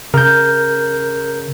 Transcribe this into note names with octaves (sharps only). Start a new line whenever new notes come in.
C#3 A#4 G6